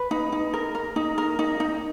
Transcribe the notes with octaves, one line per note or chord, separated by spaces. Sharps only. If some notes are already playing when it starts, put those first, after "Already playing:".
Already playing: B4
D#4
D#4
A#4
A#4
D#4
A#4
D#4
D#4